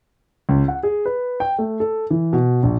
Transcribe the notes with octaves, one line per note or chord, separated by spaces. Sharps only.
C#2
F#5
G#4
B4
G5
A3
A4
E3
B2
A#1